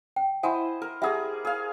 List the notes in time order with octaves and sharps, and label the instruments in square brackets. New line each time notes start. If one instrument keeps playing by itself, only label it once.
[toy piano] G5
[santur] E4 C5 D#5 [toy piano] E5 F#5 G#5
[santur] A#4
[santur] G3 G#4 A#5 [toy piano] E5 F#5 E6
[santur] G#4 F5